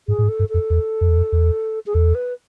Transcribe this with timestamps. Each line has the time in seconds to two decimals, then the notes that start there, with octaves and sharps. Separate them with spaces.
0.08 G#2 G#4
0.18 A2
0.24 G#2
0.29 A4
0.39 G2
0.49 F2 A4
0.70 E2
1.01 F2
1.09 E2
1.17 F2
1.32 E2
1.86 G#4
1.94 E2 A4
2.15 B4